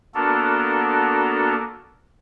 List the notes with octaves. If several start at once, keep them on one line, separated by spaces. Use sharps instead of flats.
A#3 B3 D4 F#4 A4 A#4